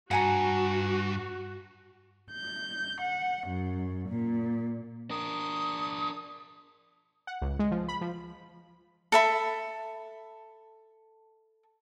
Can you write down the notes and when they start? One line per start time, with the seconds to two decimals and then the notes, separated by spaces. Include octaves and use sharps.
0.11 G2 F#4 F#5 G#5 A#5
2.32 G6
3.01 F#5
3.46 F#2
4.08 A#2
5.10 D4 A#4 D#6
7.27 F#5
7.42 C#2
7.59 G#3
7.71 F3
7.88 B5
8.01 F3
9.12 A4 E5 B5